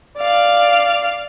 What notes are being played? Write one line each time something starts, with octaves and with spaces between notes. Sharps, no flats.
D5 F5